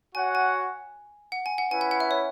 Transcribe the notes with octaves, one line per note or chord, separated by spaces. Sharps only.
F#4 C#5 F#5 G#5
G#5
F#5
G#5
F#5
C#4 E4 B4 G#5
F#5
F#5
E5
C#5